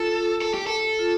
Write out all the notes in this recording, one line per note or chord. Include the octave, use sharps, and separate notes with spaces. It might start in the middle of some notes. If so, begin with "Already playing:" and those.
Already playing: F4 A4
A4
G4
A4
F4